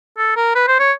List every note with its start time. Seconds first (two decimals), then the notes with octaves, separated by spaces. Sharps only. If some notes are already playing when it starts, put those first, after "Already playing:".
0.18 A4
0.37 A#4
0.55 B4
0.68 C5
0.79 C#5